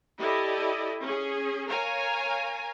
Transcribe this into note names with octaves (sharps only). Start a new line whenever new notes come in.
E4 G4 A4 D5 D#5
C#4 G#4
A#4 C#5 F5 G#5 A#5